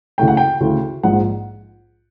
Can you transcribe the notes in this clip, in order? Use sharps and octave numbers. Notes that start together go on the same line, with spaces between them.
D2 C#3 E3 A3 G5
F#5
G5
D2 C#3 E3 A3
A#1 G#2 F3 G#3 F#5